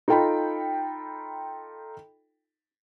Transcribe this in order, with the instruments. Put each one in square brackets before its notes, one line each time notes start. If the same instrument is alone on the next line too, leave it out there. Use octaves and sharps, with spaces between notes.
[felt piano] D#4 F4 A4 G5 A#5 B5